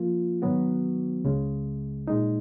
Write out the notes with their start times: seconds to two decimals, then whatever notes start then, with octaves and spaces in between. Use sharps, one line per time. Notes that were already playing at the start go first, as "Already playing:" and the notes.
Already playing: F3 A#3 F4
0.42 G#2 D#3 F#3 B3 F#4
1.24 C#2 C#3 G#3
2.08 A#2 G#3 D#4